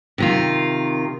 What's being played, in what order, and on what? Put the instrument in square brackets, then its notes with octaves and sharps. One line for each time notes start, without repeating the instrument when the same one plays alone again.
[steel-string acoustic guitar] C3 D#3 F4